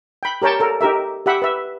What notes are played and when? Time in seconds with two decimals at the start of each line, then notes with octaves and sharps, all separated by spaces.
0.23 G5 B5
0.42 G4 A#4 C#5 G5 A5
0.60 A4 A#4
0.81 D#4 G4 A#4 E5
1.26 G4 E5 F#5 B5
1.42 B4 E5